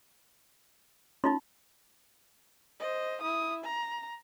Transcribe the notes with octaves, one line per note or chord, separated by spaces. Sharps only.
C#4 D#4 F4 C6
C5 D#5
E4 D#6
A#5